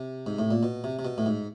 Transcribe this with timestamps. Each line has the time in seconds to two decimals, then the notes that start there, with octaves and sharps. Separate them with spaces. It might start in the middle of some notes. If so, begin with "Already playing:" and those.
Already playing: C3
0.26 G#2
0.39 A2
0.51 A#2
0.63 B2
0.84 C3
0.99 C3
1.05 B2
1.18 A2
1.26 G#2